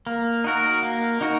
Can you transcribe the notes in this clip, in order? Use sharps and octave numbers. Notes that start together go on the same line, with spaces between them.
A#3
D#4 F#4 A#4
A#3
D#4 F#4 A#4